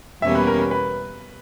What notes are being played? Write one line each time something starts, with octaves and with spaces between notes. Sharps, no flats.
E2 B2 G3 A#3 C#4 E5
B4
A#4
B4
B4